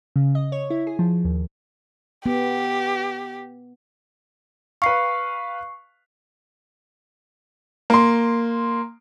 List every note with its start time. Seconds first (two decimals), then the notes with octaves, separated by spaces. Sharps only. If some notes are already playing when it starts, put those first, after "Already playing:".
0.16 C#3
0.35 D#5
0.52 C#5
0.70 E4
0.87 G#4
0.99 F3
1.25 D#2
2.26 B3 G4
4.82 B4 F5 C#6 C7
7.90 A#3 C6